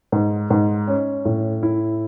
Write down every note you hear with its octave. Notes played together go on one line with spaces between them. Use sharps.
G#2
G#2
C#4
A2
E4